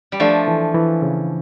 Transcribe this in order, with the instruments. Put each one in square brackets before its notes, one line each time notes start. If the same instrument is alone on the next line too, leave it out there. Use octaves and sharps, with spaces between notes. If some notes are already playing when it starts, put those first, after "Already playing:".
[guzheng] G3
[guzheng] F3 A3 [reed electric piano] D4
[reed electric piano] E3
E3
C#3